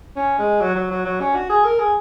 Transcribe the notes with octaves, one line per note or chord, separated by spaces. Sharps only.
C#4
G#3
F#3
F#3
F#3
F#3
C#4
F#4
G#4
A#4
G#4